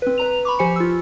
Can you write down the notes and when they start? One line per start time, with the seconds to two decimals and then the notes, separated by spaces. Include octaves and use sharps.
0.02 C4 B4
0.18 B4 A#5 F7
0.45 B5 C#6 D6
0.59 F3 G4 C5 G#5 C#7
0.76 F4 E6